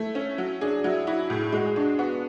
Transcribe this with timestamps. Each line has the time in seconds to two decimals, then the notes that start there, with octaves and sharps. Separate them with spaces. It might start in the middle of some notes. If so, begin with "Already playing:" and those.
Already playing: A3 E4
0.15 C#4
0.38 F#3
0.61 D4 G#4
0.84 F#3 E4
1.07 E4 F#4
1.30 A2 G#4
1.52 G#3 F#4
1.65 G#4
1.76 D4 F#4
1.99 B3 F#4